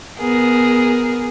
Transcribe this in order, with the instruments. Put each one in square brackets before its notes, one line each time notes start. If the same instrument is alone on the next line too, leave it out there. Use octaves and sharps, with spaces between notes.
[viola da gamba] B3 G#4 A#4